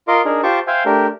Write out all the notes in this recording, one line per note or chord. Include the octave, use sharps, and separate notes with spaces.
F4 A#4 D#5 C6 D6
D4 D#4 G#4 A#4
F4 G4 C5 A5 C#6 D6
C5 E5 F5 G5 G#5
A3 D4 G4 A#4